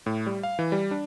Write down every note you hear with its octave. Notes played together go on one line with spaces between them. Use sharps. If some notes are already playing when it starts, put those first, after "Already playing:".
A2
G3
F5
E3
G3
D4